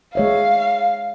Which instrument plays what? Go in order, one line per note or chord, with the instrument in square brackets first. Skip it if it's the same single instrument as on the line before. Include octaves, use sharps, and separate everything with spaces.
[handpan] G#3 C#5 E5 [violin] F5